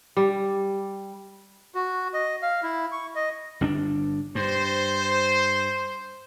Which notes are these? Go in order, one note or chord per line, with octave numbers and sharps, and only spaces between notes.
G3
F#4
D#5
F5
E4
C#6
D#5
G1 C#4 D4
G2 C5